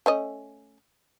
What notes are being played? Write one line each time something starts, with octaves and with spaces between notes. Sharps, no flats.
A3 C#4 D#5